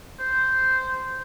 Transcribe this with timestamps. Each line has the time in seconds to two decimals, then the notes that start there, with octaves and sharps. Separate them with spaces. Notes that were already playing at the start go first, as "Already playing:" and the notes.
0.19 C5